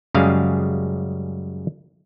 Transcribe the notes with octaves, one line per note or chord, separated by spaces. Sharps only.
F#2 C#3 G3 G#3 G#4 F5